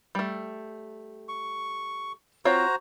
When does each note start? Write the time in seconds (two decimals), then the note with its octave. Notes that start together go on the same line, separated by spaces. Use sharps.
0.15 G3 A3
1.29 C#6
2.45 C4 F4 F#4 C5 C#5 A#5